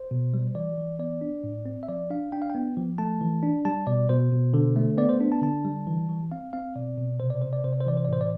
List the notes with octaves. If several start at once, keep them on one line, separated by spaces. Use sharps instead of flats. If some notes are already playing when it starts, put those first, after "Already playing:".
Already playing: C5
B2
G3
E3 D5
E3
B3 D5
D4
A2
C4
E5
F3 D5
D4 F5
D4 G5
F5
G5
B3
F3
A3 A5
E3
D4
G3 A5
B2 D5
B2 C5
B2
D3
A3
B3 D5
C5
D4
A5
D3 A5
G3
E3
E3
C4 F5
C4 F5
B2 D5
B2
C3 C5
D5
C3 C5
D5
C3 C5
D5
C5
E3 D5
C5
D5
A2 C5
D5